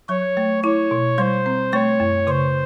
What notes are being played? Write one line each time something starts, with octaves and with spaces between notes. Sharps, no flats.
F#3 C#5
A3
E4 C#5
B2
G3 C5
C4
A3 C#5
F#2
C#3 C5